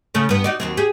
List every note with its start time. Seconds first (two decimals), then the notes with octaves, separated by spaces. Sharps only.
0.14 C#3 A3 C#4
0.29 G2 B3
0.44 D#4 F#4 D5
0.60 D#2 F#3 C4
0.77 G4 G#4